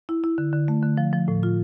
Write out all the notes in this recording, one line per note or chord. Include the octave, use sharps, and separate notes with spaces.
E4
E4
D3
D3
A3
D3
F3
F3
A2
F4